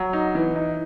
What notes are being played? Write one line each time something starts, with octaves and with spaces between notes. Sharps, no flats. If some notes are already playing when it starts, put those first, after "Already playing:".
Already playing: F#3
D#4
E3
D#4